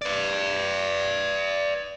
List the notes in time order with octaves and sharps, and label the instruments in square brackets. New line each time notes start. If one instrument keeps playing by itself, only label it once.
[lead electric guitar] B4 D5